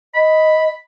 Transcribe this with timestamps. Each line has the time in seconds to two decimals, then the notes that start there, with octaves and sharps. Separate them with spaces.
0.15 D#5 B5